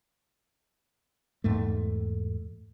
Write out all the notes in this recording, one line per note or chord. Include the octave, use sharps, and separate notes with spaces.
E2 G#2 A3